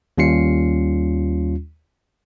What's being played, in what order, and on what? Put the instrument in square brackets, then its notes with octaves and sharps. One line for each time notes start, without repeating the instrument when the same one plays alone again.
[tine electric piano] D#2 G3 C#4 F4 C7 C#7